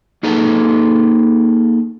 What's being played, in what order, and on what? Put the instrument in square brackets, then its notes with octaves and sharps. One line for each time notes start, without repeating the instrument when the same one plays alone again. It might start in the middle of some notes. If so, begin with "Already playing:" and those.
[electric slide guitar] A#3 D#4 G#4 A4 B4 A#5